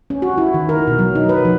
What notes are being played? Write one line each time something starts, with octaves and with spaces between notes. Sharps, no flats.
C#4
F#4
E4
D#3
A#4
B2
F#3
D#4
B4
F3